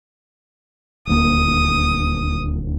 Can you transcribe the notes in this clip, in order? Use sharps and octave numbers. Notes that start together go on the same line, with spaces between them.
D#1 D2 A#3 D#6